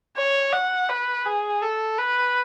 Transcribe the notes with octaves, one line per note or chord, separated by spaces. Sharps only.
C#5
F#5
B4
G#4
A4
B4